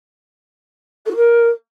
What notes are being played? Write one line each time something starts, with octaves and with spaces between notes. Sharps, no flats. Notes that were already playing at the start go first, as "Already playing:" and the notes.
A4
F#4
A#4